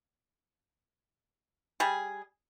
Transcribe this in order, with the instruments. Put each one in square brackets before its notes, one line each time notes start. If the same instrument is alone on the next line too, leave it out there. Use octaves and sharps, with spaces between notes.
[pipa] G3 G#4